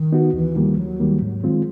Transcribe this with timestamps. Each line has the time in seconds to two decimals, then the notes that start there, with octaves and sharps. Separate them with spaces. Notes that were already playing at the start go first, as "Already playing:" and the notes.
Already playing: D#3
0.13 B3 D#4 F#4
0.33 D#2 E3
0.55 D#3 F3 G3 A#3
0.78 D#2 F#3
1.00 D#3 G3 A#3
1.22 G#2
1.44 D#3 G#3 C4 F4